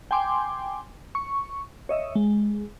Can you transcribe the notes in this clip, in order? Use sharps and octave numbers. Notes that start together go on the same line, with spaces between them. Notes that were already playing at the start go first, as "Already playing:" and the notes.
G5 G#5 C6 D6
C#6
C#5 D#5 E5
G#3